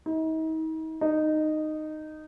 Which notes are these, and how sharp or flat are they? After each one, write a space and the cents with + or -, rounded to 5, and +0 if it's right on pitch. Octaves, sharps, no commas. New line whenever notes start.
D#4 +40
D#4 -10